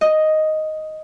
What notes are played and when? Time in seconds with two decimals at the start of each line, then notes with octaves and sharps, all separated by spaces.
0.01 D#5